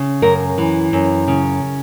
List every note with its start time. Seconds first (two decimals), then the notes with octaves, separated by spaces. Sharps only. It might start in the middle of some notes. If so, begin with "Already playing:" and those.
Already playing: C#3
0.22 F#2 A#4
0.58 E3
0.93 F#2
1.28 C#3